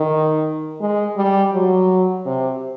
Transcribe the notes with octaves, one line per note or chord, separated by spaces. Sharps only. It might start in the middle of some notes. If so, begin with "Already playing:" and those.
Already playing: D#3
G#3
G3
F#3
C3